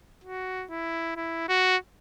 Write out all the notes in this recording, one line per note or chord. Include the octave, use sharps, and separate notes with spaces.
F#4
E4
E4
F#4